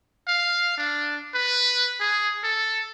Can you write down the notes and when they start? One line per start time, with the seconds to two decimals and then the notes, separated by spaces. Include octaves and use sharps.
0.28 F5
0.78 D4
1.35 B4
2.00 G#4
2.44 A4